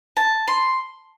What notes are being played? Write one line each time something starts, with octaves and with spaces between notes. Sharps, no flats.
A5
C6